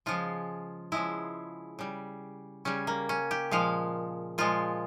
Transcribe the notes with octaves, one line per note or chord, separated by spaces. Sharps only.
C#3 F3 G#3 F4
C#3 F3 G#3 E4
C#3 G3
C#3 G3 C#4
A#3
C#4
G4
A#2 F3 G#3 F5
A#2 F3 G#3 F4